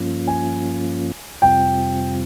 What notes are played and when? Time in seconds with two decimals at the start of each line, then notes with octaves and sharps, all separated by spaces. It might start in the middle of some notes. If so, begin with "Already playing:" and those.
Already playing: G2 F3 A#3 C#4 F4
0.27 G#5
1.42 F2 C3 G3 C4 F4 G5